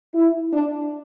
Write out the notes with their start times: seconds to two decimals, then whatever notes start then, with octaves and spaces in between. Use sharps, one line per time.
0.15 E4
0.53 D4